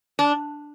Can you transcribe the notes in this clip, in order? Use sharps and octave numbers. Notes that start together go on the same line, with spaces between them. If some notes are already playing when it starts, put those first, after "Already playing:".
D4